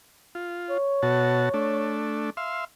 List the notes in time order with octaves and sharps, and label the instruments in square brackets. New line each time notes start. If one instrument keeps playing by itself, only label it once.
[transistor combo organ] F4
[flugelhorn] C#5
[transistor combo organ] B2 F#4 A5
A3 D4
E5 F5 C6